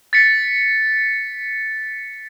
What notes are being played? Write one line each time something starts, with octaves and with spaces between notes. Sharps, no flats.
A6 B6 C#7